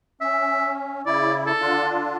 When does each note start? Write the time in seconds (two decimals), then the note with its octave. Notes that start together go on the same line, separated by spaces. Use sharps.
0.21 C#4 E5
1.06 C#3 E4 D5
1.47 A4
1.60 D3 D4 F4